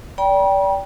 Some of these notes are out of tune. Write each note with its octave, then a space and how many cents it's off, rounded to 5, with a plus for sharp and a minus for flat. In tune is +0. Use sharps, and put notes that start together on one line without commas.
D5 -25 G5 +0 B5 -45